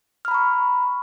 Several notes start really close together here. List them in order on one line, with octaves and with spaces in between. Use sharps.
F6 B5 A#5 C#6